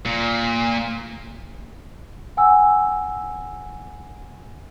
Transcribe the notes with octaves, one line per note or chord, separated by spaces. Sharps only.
A#2
F#5 G#5 E6